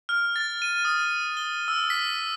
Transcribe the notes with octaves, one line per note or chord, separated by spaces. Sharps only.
F6
A6
D#7
D#6
G7
E6
B6